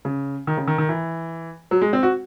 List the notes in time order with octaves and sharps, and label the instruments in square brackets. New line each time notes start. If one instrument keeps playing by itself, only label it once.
[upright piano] C#3
D#3
C#3
D#3
D#3
E3
F#3
G#3
C4
F#4